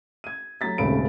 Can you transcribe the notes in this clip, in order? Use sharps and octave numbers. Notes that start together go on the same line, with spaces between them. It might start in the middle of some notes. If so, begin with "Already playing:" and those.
G#6 D#7
F#3 A3 A#5 A6 B6
D#1 G#1 C#3 A3 B5 D7